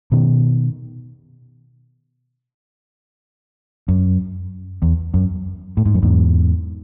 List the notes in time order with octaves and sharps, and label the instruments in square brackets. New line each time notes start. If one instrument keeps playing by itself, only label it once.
[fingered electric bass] B2 D#3
F#2
E2
F#2
A2
G#2
F#2
E2 G#2